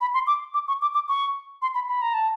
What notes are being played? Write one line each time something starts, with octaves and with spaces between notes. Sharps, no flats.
B5
C6
D6
D6
C#6
D6
D6
C#6
C6
B5
B5
A#5
A5